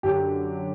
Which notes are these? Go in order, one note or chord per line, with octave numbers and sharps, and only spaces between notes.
F#2 D3 F#3 G4